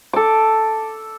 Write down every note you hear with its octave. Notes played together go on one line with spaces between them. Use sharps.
A4 D6